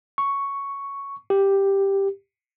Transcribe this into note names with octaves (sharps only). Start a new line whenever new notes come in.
C#6
G4